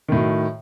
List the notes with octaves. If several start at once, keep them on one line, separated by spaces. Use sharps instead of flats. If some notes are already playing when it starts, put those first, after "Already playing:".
A2 D#3 F#3